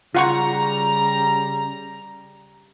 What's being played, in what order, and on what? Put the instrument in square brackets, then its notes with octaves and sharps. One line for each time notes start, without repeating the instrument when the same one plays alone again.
[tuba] C#3 [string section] G3 A#5 [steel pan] F4 F#5 C#6